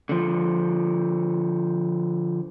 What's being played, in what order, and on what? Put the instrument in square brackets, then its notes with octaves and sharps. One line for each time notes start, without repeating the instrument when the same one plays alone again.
[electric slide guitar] D3 F3